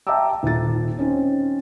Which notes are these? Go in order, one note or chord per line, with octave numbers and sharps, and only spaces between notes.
E5 G5 A5 A#5 D6 E6
D#1 D#2 F4 A6
C4 C#4 D#4 C5